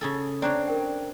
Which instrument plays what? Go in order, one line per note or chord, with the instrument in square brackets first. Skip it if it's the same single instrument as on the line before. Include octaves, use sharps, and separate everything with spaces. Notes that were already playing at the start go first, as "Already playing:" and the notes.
[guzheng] C#3 G#4 A4
[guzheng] C4 D4 C#5 [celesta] D5 A#5 F#6
[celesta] A#4 G5